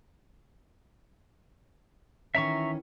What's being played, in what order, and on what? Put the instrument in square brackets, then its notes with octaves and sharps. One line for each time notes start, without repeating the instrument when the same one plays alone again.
[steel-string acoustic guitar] D#3 E3 C#4 [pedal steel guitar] E5 A#5 C#6